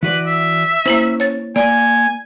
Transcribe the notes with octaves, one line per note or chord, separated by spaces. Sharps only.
E3 F#4 B4 D5
E5
A#3 C#4 E4 C5
C#5 A6
A#3 D5 G#5